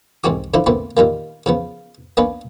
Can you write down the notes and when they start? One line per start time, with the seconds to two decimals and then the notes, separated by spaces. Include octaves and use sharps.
0.24 C2 G#2 C4 C#4 F#4 D6
0.54 D3 F3 D4 E4 C5
0.66 A#2 D3 A3 B3 C4
0.97 A#2 D#3 G3 A#3
1.46 C#3 F3 B3
2.17 A#3 B3 C#4 D4 B4